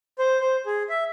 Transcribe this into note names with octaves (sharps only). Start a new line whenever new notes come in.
C5
C5
G#4
E5